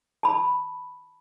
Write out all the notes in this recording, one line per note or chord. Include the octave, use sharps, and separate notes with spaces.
A5 B5